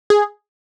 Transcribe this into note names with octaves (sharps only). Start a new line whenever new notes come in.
G#4